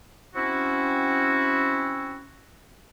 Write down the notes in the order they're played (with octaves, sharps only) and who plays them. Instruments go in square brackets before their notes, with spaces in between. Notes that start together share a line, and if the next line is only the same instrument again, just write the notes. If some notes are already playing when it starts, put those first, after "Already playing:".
[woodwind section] C4 C#4 E4 F#4